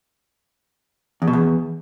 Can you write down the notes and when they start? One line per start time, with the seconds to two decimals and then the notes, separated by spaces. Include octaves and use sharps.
1.22 E2
1.28 B2
1.33 E2